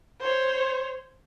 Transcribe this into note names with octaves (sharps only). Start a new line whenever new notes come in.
C5 C#5